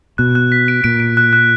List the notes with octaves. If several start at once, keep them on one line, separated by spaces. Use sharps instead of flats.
B2 F#6
F#6
B6
D7
A#2 D7
D7
F#6
F#6